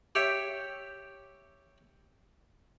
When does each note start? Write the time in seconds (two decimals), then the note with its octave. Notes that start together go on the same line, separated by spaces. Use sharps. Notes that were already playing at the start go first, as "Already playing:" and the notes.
0.15 G4 C#5 E5 G5